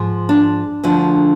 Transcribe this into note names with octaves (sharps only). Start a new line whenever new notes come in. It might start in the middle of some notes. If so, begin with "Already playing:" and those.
Already playing: G#2 F3
D4
D2 D3 F3